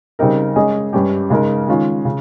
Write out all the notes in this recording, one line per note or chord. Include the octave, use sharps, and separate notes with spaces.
C#3 G3 C4 D#4 A#4
G#3 C#4 G#4 D#5
G2 G3 C#4 G4
C#3 G#3 D#4 A#4
D#3 G#3 C#4 F4
C#3